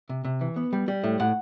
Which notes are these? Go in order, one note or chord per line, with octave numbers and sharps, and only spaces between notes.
C3
C3
E3
B3
G3
G3
A2
A2 F#5